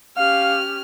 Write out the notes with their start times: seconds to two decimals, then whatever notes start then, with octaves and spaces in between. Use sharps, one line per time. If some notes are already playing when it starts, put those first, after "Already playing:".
0.17 C#4 G4 F5 F6